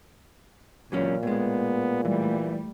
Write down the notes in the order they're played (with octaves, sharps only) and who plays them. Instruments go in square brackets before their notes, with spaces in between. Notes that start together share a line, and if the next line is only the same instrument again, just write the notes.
[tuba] C#2 [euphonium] A#2 [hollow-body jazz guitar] E3 F#3 C#4
[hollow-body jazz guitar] A2 G#3 [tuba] B3
[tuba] E3 [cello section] G3 A3